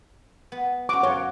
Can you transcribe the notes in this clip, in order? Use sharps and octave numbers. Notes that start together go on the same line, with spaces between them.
B3
C#4 F#4 D6
F#2 F4 C#5 F#5